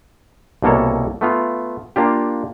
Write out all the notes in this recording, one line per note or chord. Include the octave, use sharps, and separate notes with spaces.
C2 B2 A#3 A4 C#5
A3 B3 F4
A#3 D4 F4 G4